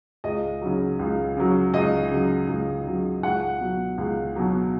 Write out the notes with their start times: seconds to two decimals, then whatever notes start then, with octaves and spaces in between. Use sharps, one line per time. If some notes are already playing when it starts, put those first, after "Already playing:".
0.24 C#2 D#5
0.61 C#3 F#3
0.99 C#2
1.37 C#3 F#3
1.74 C#2 D#5
2.11 C#3 F#3
2.48 C#2
2.86 C#3 F#3
3.23 C#2 F#5
3.61 B2 F#3
3.98 C#2
4.36 B2 F#3